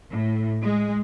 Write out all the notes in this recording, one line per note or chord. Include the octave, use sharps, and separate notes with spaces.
A2
G#3